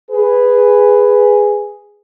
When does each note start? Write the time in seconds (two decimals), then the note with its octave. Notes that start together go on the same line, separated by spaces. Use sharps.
0.11 G#4 B4